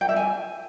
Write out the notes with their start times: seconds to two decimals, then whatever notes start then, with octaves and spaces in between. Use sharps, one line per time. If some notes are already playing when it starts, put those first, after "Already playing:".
0.01 G5
0.09 E5
0.16 G#5